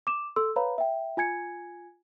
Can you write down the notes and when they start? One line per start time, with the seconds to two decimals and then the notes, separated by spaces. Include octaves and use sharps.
0.07 D6 E7
0.36 A4 C6 E6
0.56 B4 C#5 F5 A#5 B5
0.78 E5 G5
1.17 F4 G#5 G#6 C#7